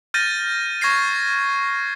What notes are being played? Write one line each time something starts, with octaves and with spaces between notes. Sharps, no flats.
F6 G6 A6 A#6 D#7
C#6 G#6 A#6 C7 D#7